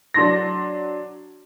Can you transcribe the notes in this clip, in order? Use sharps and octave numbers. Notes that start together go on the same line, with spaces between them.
F#3 D4 C6 A#6